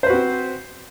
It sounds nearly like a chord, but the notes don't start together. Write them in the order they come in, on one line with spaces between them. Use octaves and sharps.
C5 B4 F#4 C4